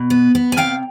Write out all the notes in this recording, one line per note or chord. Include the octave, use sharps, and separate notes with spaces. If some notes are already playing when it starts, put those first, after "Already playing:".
Already playing: B2
B3
B3
G#5
C3 F5 G5